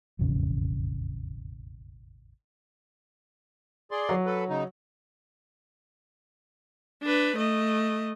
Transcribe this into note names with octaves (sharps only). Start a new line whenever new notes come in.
E1 A1 F2 C#3
G#4 D5 C6
F#3
A4 B4
C#3 D#4
D4 B4
A3 D#5